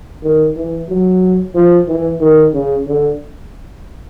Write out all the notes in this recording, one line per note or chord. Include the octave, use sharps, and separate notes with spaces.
D#3
E3
F#3
F3
E3
D#3
C#3
D3